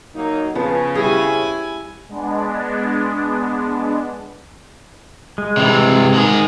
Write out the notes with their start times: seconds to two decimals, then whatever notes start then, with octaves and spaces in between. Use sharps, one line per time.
0.15 F#3 A#3 D#4
0.55 C#3 F3 B3
0.95 G3 E4 G#4 G#5
2.09 G#3 B3 D4
5.38 G#3
5.57 C3 E3
6.14 D#3 G#4